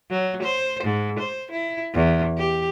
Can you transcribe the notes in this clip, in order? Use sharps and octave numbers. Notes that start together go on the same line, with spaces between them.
F#3
C5
G#2
C5
E4
E2
G4